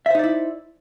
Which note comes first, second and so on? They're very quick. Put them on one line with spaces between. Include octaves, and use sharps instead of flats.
E5 C5 D#4 D5 E4